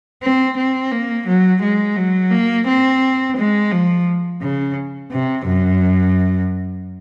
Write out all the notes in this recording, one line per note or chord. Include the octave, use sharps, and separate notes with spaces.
C4
C4
A#3
F#3
G#3
F#3
A#3
C4
G#3
F3
C#3
C3
F#2